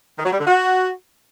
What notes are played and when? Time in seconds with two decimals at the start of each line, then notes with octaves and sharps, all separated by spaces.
0.18 D#3
0.25 F#3
0.32 G3
0.40 D3
0.47 F#4